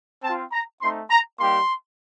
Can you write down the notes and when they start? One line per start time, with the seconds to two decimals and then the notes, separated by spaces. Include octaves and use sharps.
0.23 C4 F4 A5
0.52 A#5
0.80 A3 C4 D#4 C6
1.10 A#5
1.38 G3 A#3 D#4 G4 C6